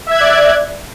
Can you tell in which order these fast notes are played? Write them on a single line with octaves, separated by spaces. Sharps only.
E5 G#6 F#6 D5